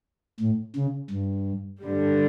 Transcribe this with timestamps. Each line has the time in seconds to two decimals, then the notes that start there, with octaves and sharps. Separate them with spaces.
0.40 A2
0.76 C#3
1.11 G2
1.82 G2 D3 G3